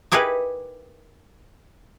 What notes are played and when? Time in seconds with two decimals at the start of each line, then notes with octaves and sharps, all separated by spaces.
0.12 D#4 E4 G4 G#4 A#4 B4